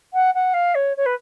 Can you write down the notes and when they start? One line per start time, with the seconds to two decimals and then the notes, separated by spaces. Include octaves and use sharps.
0.14 F#5
0.35 F#5
0.54 F5
0.75 C#5
0.97 C#5
1.06 B4